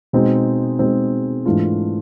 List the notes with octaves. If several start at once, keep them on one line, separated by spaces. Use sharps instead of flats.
B2 G#3 C4 D#4
B2 G#3 C4 D#4
G#2 E3 A3 D4 F4